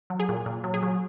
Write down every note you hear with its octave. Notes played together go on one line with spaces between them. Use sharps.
F#3
G#4
A#2
A#2
F#3
G#4
F#3